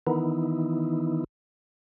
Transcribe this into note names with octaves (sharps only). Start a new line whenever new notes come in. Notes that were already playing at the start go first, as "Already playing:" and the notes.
D#3 E3 B3 D#4 E4